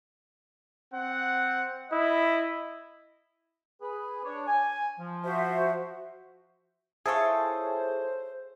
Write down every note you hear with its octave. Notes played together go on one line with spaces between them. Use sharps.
C4 F#5
E4 D#5
G#4 B4
D4 C#5
G#5
F3
F#4 C5 E5
E4 F4 G#4 A4 C5 C#5